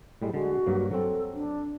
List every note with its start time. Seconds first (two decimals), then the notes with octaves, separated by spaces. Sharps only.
0.22 A2 G3 G#3
0.34 D3 G#3 F#4
0.66 G2 F#3 A#3
0.91 F#3 C4 A4
1.34 D4